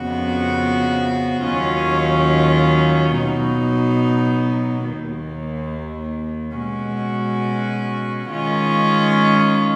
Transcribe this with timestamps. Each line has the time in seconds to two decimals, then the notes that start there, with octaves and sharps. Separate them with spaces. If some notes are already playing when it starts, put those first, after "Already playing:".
Already playing: F2 C#3 F3 B3 F#4
1.45 D#2 D#3 F#3 C#4 F4
3.16 B2 F#3 B3 D#4
4.88 D#2 D#3 A#3
6.59 B2 G#3 C#4 F#4
8.29 D#3 G#3 C#4 F4